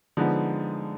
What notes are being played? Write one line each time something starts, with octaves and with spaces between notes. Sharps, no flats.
D3 F3 G#3 B3 D#4